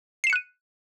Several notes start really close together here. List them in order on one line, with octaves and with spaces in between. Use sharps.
C7 E7 C#7 F#6 D#7